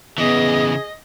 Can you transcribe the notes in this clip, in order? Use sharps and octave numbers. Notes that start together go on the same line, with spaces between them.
C#3 E3 B3 G#4 D#5